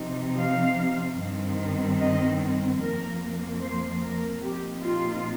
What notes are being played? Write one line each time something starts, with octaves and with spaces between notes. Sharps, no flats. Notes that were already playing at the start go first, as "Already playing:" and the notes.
Already playing: C3 F3 C4 D#4
F5
G2 D#3 C4
D#5
F2 F3 A#3 A#4
C5
A#4
A#2 F3 C4 D#4 G4
F4